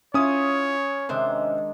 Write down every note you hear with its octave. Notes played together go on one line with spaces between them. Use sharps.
C#4 E4 F4 C#5 D#6
C3 D#3 G#3 D4 C5 E5